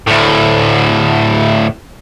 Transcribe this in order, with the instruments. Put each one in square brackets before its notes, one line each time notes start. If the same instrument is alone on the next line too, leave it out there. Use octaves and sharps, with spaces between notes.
[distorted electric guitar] D2 A2